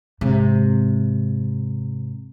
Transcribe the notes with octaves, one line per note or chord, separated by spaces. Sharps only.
G#2 C3